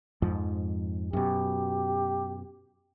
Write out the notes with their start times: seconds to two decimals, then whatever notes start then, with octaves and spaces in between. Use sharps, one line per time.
0.22 F2 G#2 F3
1.13 F#2 B2 G4